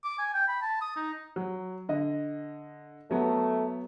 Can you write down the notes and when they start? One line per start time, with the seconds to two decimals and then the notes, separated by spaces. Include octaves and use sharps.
0.04 D6
0.18 G#5
0.34 G5
0.48 B5
0.61 A5
0.81 D#6
0.96 D#4
1.36 F#3
1.89 D3 D#5
3.11 F#3 A3 B3